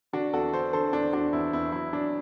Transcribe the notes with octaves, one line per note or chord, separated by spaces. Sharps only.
D3 D4 F#4
E2 F#4 A4
D3 A4 C5
D3 A4 C5
E2 D4
E2 D4 F#4
E2 E4
E2 E4
F#3 E4
F#3 D4